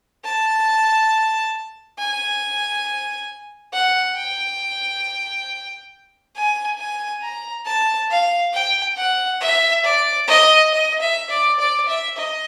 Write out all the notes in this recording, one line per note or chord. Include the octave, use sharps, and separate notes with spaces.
A5
G#5
F#5
G5
G#5
G#5
A#5
A5
F5
G5
F#5
E5
D5
D#5
D#5
E5
D5
D5
E5
D#5